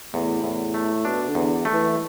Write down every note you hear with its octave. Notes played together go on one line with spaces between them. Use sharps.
E2 A2
E2
A3
B2 D4
D3
E2
A3
E3